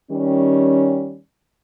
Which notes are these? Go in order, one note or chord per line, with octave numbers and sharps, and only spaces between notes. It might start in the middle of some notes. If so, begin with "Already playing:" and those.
D#3 G3 C#4